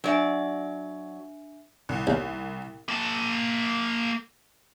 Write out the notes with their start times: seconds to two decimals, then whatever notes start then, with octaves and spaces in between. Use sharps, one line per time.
0.04 F#3 D4 D5 E5 G#5
1.89 C2
2.07 D#2
2.89 A#3 A5